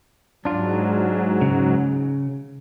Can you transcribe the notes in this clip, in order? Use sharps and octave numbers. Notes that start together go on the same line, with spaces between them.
G#2 F#3 D4 F4
C#3